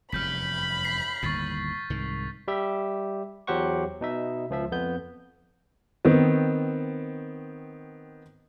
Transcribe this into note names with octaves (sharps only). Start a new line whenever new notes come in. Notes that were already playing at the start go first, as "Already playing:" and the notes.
F1 E2 G2 B5 F6 G6 B6
B6 C7
G1 D#2 A2 C#6 A6 B6
C2 G#2 D#3
G3 G4 E5
E2 F#3 G4 C5 F#5 C#6
B2 D#4 E5
C#2 F3 E5
F2 B3 G6
D#3 B3 C4